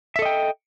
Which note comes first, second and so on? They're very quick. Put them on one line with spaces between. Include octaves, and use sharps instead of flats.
E5 A4 D#5 G5